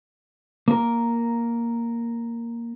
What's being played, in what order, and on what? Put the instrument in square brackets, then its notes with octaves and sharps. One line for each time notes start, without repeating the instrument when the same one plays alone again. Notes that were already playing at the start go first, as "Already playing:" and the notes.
[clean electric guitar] A#3 A#4